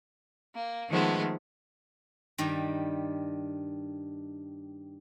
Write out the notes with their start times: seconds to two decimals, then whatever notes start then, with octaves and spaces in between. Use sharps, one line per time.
0.56 A#3
0.88 D#3 F3 G#3 A3 B3
2.38 G2 D#3 G3